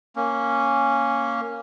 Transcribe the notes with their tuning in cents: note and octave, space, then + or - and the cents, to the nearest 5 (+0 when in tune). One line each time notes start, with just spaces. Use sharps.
A#3 -5 C#4 -5